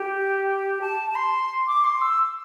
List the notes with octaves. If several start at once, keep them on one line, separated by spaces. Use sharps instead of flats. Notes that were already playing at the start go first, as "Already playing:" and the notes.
Already playing: G4
A5
A5
C6
D6
C6
E6